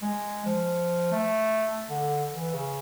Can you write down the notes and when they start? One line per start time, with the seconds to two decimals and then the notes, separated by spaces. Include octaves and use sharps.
0.02 G#3
0.46 F3
1.12 A3
1.90 D3
2.34 E3
2.54 C#3